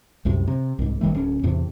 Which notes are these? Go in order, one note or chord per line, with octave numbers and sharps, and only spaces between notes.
C2 F#2 A2 C3
C3
C2 G#2
G#1 D#3 G3 A3
D1 C#4
E2 A2 C3 E3